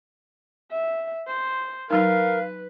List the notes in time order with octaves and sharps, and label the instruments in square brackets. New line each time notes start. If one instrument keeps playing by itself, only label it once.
[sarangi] E5
C5
[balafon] F#3 D#4 [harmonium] A#4 [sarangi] B4 [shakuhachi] F5